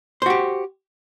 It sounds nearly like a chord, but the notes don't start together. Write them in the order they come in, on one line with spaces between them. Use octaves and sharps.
C5 F#4 G4